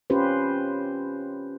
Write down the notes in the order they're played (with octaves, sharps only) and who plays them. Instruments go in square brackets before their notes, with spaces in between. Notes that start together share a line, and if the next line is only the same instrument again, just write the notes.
[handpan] C#4 F4 G4 B4 C5